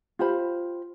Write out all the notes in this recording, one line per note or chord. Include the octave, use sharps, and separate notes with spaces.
F4 G4 C5 B5